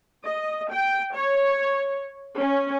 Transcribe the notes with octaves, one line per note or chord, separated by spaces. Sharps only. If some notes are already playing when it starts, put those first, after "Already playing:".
D#5
G5
C#5
C#4